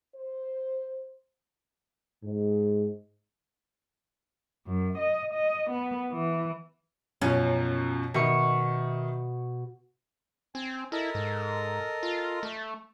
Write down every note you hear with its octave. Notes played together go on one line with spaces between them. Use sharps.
C5
G#2
F#2
D#5
D#5
B3
E3
F#2 B2 F3 C#4
B2 D#3 E5 C#6
C4 G#5
E4 A4 A#4 D#5
G#2
F4
A3